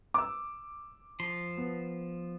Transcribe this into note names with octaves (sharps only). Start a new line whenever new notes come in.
D6 E6
F3 C6
B3